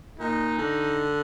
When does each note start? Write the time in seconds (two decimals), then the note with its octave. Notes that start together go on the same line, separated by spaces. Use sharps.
0.19 A#2 D#4
0.58 D3